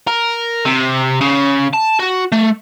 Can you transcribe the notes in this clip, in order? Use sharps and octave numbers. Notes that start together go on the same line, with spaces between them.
A#4
C3
C#3
A5
F#4
A3